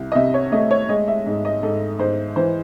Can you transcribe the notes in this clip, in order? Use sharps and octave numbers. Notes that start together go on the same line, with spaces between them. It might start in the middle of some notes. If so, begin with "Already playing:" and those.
Already playing: C2
D#5
C3 E5
C#5
A3 D#5
C#5
G#3 D#5
E5
G#2
D#5
G#2 A4
G#2 C5
E3 C5